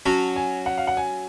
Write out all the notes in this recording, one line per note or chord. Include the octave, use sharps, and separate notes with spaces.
F#3 C#4 F#4 A5
G#5
F#5
F5
F#5
G#5